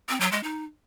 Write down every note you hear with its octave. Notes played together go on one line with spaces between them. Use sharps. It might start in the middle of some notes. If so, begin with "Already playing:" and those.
C4
F#3
G#3
D#4